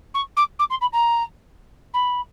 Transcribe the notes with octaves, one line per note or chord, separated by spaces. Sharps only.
C#6
D6
D6
C6
B5
A#5
B5